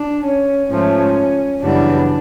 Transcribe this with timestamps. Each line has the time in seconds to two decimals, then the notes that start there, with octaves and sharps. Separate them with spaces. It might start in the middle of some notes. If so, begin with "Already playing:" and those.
Already playing: D4
0.24 C#4
0.69 G#2 F3 A3 C#4
1.61 F#2 C#3 E3 G3 B3 D4